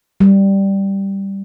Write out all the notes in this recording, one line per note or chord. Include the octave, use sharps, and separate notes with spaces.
G3